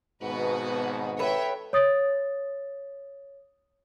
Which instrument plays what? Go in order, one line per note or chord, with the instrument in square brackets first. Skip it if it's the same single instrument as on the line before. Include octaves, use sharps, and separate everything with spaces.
[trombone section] G#1 G#2 B2 [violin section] B3 F#4 B4
[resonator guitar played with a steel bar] A4 B4 [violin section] C#5 E5 G5
[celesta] C#5 D#6 A6